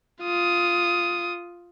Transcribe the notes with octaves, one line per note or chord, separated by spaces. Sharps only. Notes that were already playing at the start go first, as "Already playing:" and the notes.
F4 D#6